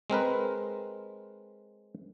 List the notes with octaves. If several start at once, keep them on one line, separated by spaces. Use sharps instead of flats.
G#3 C4 A#4 B4